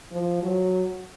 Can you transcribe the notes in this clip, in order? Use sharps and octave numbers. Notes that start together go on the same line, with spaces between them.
F3
F#3